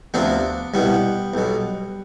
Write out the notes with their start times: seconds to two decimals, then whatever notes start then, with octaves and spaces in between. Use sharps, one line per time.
0.14 D2 C3 F3 B3 D4
0.74 C2 B2 G3 B3
1.34 B1 B2